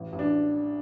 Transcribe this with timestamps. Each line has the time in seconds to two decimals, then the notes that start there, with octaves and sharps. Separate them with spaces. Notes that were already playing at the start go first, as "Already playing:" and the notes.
Already playing: A1
0.13 A1
0.19 D4